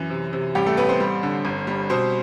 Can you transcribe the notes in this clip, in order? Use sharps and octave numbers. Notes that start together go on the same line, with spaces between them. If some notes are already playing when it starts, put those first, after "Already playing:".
Already playing: F#2 E3
C3
C3
A1 G3 G4
A3 A4
A1 B3 B4
C4 C5
G3
D3
G1
G3
B2 C4 C5